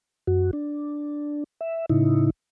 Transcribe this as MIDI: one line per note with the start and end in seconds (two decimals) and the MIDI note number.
0.27 0.51 42
0.27 0.51 66
0.53 1.44 62
1.61 1.86 76
1.90 2.30 45
1.90 2.30 49
1.90 2.30 63
1.90 2.30 64